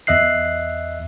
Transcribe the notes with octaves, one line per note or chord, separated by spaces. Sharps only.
E2 D#5 E5 F#6 C7